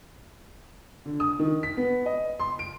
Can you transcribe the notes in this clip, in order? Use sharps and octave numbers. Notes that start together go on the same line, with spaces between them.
D3
D#6
D#3
B6
B3
D#5
C6
D7